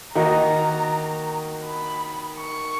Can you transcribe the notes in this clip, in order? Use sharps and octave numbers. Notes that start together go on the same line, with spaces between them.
D#3 A#3 D#4 F#4 A#4 A#5
B5
C#6